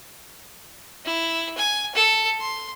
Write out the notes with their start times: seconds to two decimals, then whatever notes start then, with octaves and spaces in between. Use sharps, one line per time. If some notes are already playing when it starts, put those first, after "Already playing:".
1.05 E4
1.57 G#5
1.95 A4
2.40 C6